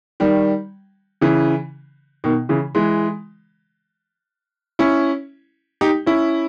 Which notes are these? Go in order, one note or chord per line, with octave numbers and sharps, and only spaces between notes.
D#3 G3
C#3 E3
B2 D#3
C#3 E3
E3 G#3
C#4 E4
D#4 G4
C#4 E4